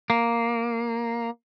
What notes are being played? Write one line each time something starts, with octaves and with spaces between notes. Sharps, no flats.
A#3